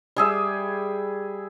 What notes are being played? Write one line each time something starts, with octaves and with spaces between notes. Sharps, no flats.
G3 G#4 E5